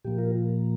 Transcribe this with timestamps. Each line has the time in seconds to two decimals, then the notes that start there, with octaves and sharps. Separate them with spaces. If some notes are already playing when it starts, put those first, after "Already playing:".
0.05 A#2 F3 A#3 G4
0.18 F4 A#4